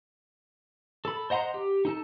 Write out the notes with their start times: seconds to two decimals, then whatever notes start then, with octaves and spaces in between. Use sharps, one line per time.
1.05 A4 B5
1.30 C5 D#5 F#5 A#5 C6
1.54 G4
1.85 D#4 A4 A5